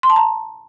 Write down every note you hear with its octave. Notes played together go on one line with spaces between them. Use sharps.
C6
A5
A#5